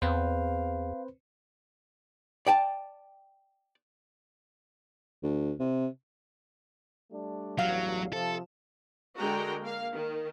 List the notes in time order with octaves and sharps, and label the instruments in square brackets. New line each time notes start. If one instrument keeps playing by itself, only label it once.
[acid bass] E2 [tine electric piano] C4 B4 C5 [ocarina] F5
[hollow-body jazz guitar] D5 G5 A5
[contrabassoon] D2
C3
[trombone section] G3 A3 D4
[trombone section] A1 E2 G2 [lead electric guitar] F#3 [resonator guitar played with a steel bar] F5
[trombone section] C3 F3 [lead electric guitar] A4
[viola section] D3 G#3 F#4 A#4 G5 A#5
A#3 F5
D#3